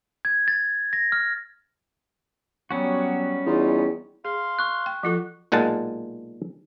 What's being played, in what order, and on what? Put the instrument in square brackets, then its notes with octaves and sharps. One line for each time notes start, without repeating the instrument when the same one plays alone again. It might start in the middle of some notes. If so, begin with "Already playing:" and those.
[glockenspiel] G#6
A6
A#6
F6
[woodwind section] F#3 B3 [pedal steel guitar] G3 C#4 F#4
[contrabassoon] E2 [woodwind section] D#4 F4
[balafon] G#4 [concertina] F5 C6
[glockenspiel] C#6 F#6
[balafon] G5
[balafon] F3 F4 A4 [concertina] F#4
[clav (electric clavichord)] B1 A#2 G#3 F#5 A5